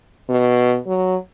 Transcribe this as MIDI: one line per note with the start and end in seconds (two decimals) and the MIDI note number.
0.29 0.78 47
0.87 1.16 54